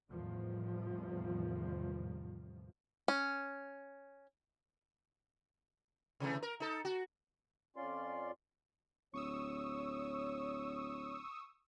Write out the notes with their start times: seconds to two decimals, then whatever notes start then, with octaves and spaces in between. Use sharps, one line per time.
0.11 E2 A2 C3 D#3 F3 G3
3.08 C#4
6.20 C3 E3 A3
6.43 A#4
6.60 D#4 A4
6.85 F#4
7.76 F2 C#4 F4 D5 C6
9.14 D1 C#5 C#6 D#6 E6